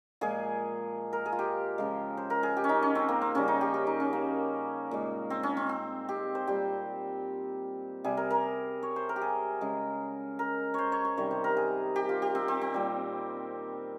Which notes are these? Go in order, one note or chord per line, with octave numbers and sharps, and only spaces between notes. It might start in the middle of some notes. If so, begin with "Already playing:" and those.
A#2 F3 G#3 G#4
A#4
G#4
F4
G4
C#3 F3 G#3
C5
A#4
G#4
G4
C#4
D#4
C#4
C4
A#3
C4
C#3 G3 C#4
D#4
G4
G4
D#4
C#4
A#3
A#2 G#3
C4
C#4
C4
C4
G4
C5
A#2 G3 G4
C3 G3 G#4
A#4
A#4
C#5
C5
A#4
G4
G#4
C#3 G#3
A#4
C5 C#5
C#5
C5
C3 D#3 G3 C#5
C5
A#4
G#4
G4
F4
G4
C4
C4
C4
A#2 G3